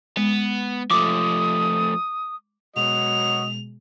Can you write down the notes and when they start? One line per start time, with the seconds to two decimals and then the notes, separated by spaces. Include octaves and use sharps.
0.17 G#3 B3
0.91 F3 A3 D6 D#6
2.76 B2 F#3 G#3 F#4 D#5 F7